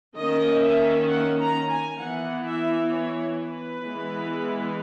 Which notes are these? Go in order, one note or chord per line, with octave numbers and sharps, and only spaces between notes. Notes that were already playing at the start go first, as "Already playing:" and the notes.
D#3 A#3 C#4 D#5
E5
F#5
A#5
G#5
E3 B3 F#5
E5
C#5
B4
E3 G#3 B3